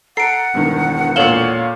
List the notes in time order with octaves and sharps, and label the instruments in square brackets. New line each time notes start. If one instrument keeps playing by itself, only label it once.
[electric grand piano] A4 A#5 [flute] F#5 [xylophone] C7 D7
[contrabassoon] E1 [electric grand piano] G2 D#3
[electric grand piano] A#2 C#5 F5 [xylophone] A4 E7 G7